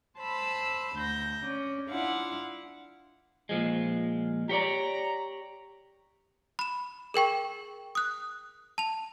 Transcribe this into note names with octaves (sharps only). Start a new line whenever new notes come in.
C5 A5 B5 E6
D2 G6 A#6
C#4 D5
D4 E4 F4 F5 F#5
A#2 F3 G#3
G4 C#5 D5 A#5
B5 E7
G#4 A#4 G5 C#6
D#6 F#6
A5 F7